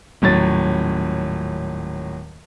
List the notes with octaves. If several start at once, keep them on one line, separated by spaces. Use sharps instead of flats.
D#1 A2 F#3 C#5 A6